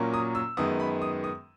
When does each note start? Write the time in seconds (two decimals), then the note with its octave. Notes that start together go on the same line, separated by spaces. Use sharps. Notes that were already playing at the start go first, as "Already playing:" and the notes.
Already playing: A#2 F#3 A#3 C#4
0.14 D#6
0.35 E6
0.57 F#2 D#3 G#3 B3 D#6
0.80 B5
1.02 D#6
1.24 D#6